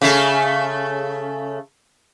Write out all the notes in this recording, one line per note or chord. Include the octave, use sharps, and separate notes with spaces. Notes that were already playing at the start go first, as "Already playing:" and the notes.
C#3 A3 A4